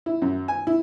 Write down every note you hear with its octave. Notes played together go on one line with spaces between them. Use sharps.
E4
F#2
G#5
E4